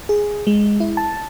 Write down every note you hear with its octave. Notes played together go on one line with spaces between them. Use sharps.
G#4
G#3
E4
A5